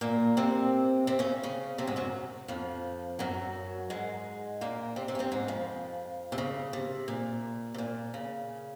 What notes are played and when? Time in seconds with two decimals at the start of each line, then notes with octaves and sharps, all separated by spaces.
0.01 A#2 A#3
0.37 C3 C4
1.07 C3 C4
1.19 C#3 C#4
1.43 C#3 C#4
1.78 C3 C4
1.87 G#2 G#3
1.96 F#2 F#3
2.48 F2 F3
3.19 F#2 F#3
3.90 G#2 G#3
4.61 A#2 A#3
4.96 C3 C4
5.08 C3 C4
5.15 C#4
5.19 C3 C4
5.32 G#2 G#3
5.48 F2 F3
6.32 C3
6.38 C#3
6.73 C3
7.08 A#2
7.74 C3
7.78 A#2
8.14 C#3